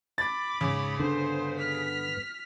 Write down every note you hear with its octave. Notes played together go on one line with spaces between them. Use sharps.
B5 D6 A6
G#2 C#3 C#5
G2 D3 B3 C5
F6 B6